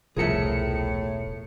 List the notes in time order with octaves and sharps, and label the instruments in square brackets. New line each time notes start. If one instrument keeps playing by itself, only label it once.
[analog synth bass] E1 [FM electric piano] C2 F3 C#7 [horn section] A2 [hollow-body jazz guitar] G#4 A#4 E5